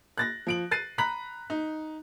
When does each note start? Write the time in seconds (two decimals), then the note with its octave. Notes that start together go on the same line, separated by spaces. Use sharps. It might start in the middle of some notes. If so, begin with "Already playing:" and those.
0.18 F#6 A6 A#6
0.47 F3 D7 F#7
0.71 F#6 A6 C7 D#7
0.98 A#5 B5 F#6 B6 F#7
1.50 D#4